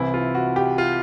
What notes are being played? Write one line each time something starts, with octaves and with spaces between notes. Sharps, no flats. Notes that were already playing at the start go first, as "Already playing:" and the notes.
Already playing: C2 C3 E3 E4
F4
F#4
G4
F4